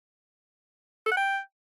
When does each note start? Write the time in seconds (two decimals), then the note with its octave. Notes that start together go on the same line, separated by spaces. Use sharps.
1.06 A4
1.12 F#5
1.17 G5